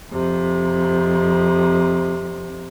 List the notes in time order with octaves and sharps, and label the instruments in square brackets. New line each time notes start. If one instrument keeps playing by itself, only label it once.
[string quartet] F2 C3